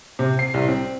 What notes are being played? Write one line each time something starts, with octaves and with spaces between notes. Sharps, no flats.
C3
C7
C2
C4